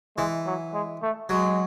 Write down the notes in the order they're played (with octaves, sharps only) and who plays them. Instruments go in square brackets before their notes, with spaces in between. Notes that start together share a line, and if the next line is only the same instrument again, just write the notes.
[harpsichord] E3 [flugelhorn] G#3
[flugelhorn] F#3
G#3
A3
[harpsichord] F#3 [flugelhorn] G#3